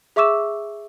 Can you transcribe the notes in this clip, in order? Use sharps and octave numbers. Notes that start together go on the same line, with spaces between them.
G#4 E5 C#6 D6 E6 E7